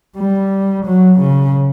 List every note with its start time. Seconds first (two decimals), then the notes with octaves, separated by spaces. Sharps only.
0.17 G3
0.86 F#3
1.20 C#3